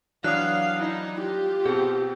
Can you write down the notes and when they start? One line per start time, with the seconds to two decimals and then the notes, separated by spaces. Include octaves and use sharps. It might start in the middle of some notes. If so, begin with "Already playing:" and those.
0.24 E3 F#3 D4 F5 D#6 F#6
0.79 D#4 E4
1.20 F4 G4
1.66 B2 C4 G#4